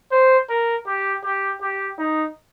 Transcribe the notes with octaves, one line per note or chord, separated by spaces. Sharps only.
C5
A#4
G4
G4
G4
D#4